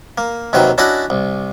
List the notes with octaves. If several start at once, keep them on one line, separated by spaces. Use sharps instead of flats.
A#3
D#2 C3 D#3 F#3 B4
C#4 D4 E4 F#4 D#5 F#5
C2